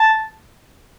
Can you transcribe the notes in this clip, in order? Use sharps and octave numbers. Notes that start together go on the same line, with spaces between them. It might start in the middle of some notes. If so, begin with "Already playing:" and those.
Already playing: A5